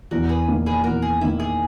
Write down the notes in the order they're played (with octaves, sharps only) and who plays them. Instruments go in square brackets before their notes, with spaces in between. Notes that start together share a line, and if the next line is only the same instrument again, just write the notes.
[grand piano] E2 [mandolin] F#4 A#4
[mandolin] G#4 B4
[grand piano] D#3 A#3
[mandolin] G#4 B4
[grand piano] E2 [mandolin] F#4 A#4
[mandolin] G#4
[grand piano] D#3 A#3 [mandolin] E4
[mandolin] G#4